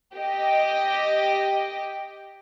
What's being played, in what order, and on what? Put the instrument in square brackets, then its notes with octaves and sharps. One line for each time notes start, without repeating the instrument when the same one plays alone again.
[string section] G4 D#5